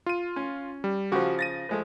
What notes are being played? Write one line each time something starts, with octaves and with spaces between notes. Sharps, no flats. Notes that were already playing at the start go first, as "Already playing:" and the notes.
F4 D#7
C#4
G3
C#3 F3 F#4 G4
A6 A#6 D#7
F3 G#3 A3